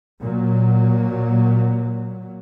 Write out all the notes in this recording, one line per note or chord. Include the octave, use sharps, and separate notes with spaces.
A#2 F#3